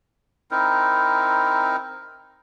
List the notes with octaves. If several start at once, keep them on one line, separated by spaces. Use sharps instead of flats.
C4 D#4 E4 A#4